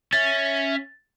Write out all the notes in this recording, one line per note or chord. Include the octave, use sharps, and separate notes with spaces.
C#4 E5 A6